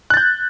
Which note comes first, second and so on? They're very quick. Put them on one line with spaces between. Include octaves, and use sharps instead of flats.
F#6 A6 G6